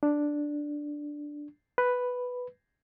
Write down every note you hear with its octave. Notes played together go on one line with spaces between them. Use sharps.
D4
B4